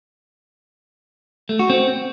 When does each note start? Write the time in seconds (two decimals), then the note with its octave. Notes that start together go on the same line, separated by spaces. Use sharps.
1.49 A3
1.59 F#4
1.70 C4